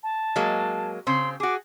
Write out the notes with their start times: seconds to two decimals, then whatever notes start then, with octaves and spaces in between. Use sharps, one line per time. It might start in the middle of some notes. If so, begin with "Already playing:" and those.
0.03 A5
0.36 F#3 G#3 A#3
1.07 C#3 C4 C6
1.40 F#4 G#4 D6